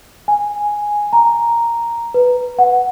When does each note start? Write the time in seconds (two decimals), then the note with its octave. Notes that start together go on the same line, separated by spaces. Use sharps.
0.28 G#5
1.13 A#5
2.14 B4
2.59 F#5